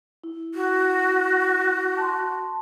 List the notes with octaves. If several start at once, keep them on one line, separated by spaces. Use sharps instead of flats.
E4
F#4
A5 C6